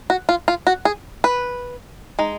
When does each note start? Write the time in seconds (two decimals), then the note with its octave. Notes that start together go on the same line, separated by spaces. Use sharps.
0.10 F#4
0.29 F4
0.48 F4
0.67 F#4
0.85 G#4
1.24 B4
2.19 G#3 D#4